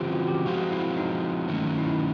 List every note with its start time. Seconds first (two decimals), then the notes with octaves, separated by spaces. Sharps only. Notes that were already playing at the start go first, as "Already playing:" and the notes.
Already playing: C#3 E3 G3 C4 F4 G4
0.12 F#4
0.28 G4
0.46 F3 G#3 C4 F4 F#4
0.72 E4
0.98 D#4
1.49 D#3 F#3 A3 C#4
1.78 E4
1.90 D#4